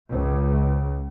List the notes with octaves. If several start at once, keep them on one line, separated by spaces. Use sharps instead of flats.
C#2